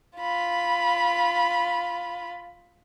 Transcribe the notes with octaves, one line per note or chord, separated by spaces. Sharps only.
F4 B5